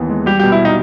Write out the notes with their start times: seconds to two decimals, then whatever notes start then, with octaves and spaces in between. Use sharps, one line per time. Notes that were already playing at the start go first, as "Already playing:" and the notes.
Already playing: D#2 E3 B3
0.09 G#3
0.26 G3 G4
0.39 G4
0.43 B2
0.52 E4
0.60 B2
0.65 D#4